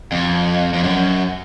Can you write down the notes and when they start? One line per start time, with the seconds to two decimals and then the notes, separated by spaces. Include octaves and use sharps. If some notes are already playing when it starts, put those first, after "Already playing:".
0.12 F2
0.74 F2
0.83 F#2